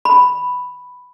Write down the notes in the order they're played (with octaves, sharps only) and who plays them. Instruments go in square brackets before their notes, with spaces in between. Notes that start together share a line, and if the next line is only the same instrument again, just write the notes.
[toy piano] B5